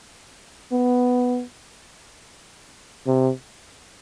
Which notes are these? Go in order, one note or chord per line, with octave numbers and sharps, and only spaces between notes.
B3
C3